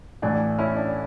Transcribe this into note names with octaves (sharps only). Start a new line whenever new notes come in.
A1 A2 E3 D4
C#4 E4
D4